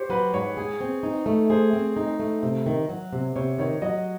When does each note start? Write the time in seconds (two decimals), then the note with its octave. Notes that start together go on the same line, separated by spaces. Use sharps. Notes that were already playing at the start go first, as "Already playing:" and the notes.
Already playing: G4 C5 C#5
0.10 F#3 B4
0.33 G#2 C#5
0.57 G#4
0.81 C4
1.03 D#4
1.26 A3
1.50 G#4 C5
1.73 C4
1.97 D#4
2.20 A3
2.43 C3
2.66 D#3
2.89 F#3
3.13 C3
3.36 C3 C#5
3.59 D#3 C#5
3.82 F#3 D#5